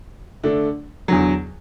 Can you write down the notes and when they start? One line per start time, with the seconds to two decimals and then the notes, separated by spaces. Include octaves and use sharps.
0.44 D3 A3 D4
1.08 E2 D3 F#3